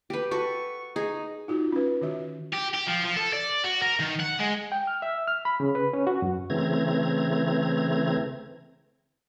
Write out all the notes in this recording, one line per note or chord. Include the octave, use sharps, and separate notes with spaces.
G4 B4
F#4 A4 B4 C#6
D#4 G#4
D#4 F4 F#4
C#4 B4
D#3 F#4 E5
G4
G4
F3
F3
A4
D5
F#4
A#4
D#3
F#5
G#3
G5
F6
E5
F6
B5
C#3
B4
C#4
F#4
F#2
C#3 E3 A3 C4 A#5 G#6